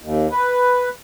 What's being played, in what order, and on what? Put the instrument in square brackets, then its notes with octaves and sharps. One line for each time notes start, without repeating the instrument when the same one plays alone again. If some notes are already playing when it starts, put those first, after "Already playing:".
[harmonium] D#2
B4